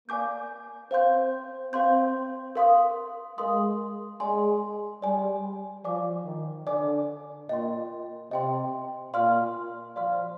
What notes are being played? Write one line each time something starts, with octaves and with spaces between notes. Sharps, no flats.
A#3 D5 F5 G#5 D6 G6
C4 C5 F5 C6 G6
C4 C5 F5 C6 G6
A#4 F5 C6 D#6
G#3 A#4 F5 C6 D#6
G#3 D5 G#5 C6
G3 D5 G#5 C6
F3 D5 G#5 D6
D#3
D3 D5 G#5 D6
A#2 D#5 G5 C6
C3 D#5 G5 C6
A#2 D5 F5 C6 F6
F3 D5 F5 C6 F6